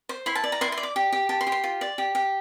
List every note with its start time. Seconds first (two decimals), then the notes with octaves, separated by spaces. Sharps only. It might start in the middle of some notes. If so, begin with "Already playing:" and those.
0.09 C5
0.26 E4 C6
0.35 A5
0.44 D5
0.52 A#5
0.61 E4 C6
0.72 C6
0.77 D5
0.83 D6
0.96 G4
1.13 G4
1.29 G4 A5
1.41 C6
1.47 G4
1.52 C6
1.64 F4
1.81 D5
1.98 G4
2.15 G4